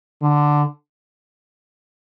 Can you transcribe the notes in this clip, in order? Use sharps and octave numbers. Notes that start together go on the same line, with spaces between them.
D3